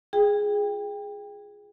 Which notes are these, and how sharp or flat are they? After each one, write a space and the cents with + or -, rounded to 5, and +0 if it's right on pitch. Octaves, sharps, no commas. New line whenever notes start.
F4 +5 G#4 +0 G5 +20